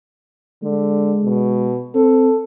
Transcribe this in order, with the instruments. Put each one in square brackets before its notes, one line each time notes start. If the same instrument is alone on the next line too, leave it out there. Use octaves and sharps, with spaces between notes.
[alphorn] D3 [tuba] G#3
[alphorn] B2
[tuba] C4 [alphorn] A4